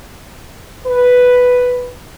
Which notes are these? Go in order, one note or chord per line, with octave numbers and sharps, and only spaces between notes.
B4